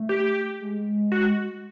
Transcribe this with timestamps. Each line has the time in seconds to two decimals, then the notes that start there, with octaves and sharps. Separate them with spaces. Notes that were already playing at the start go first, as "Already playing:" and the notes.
Already playing: A3
0.09 G4
0.60 G#3
1.12 F#4